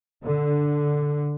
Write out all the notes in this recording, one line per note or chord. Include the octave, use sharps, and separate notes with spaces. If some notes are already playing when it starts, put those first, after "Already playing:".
D3